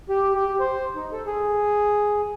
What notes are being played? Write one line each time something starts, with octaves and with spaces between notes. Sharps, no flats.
G4
G4
C5
D#4
A4
G#4